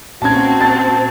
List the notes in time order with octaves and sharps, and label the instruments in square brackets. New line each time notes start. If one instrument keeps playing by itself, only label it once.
[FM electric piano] A#2 C#4 [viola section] A#3 C4 F#4 [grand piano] A5 G#6
[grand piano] A5 A6